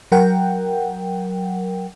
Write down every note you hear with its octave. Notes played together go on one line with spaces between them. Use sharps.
F#3 A#4 F#5 G5